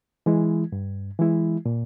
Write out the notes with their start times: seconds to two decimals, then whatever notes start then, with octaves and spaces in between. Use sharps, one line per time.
0.26 E3 G#3 E4
0.72 G2
1.19 E3 G#3 E4
1.66 A#2